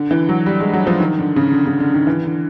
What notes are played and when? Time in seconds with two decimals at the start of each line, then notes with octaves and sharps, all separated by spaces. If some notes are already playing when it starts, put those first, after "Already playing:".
Already playing: D3
0.11 E3
0.29 F#3
0.46 G3
0.60 G#3
0.73 F#3
0.87 F3
1.00 D#3
1.19 D3
1.36 C#3
1.53 D3
1.67 C#3
1.80 D3
1.94 D#3
2.07 E3
2.25 D3